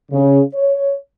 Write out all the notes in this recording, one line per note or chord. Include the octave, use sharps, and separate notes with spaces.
C#3
C#5